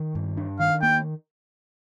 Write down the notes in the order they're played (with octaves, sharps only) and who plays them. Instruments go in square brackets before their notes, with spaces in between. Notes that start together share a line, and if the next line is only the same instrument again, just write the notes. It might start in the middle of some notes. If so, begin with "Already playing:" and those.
Already playing: [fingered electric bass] D#3
G2
D4
[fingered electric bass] D#3 [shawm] F5
[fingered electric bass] A#3 [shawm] G5